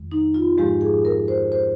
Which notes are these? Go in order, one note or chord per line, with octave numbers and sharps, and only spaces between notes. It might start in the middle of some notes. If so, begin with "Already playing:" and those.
Already playing: F2 D#3 G#3
D#4
F4
G#2 F3 G#3 G4
G#4
A#4
C5
C5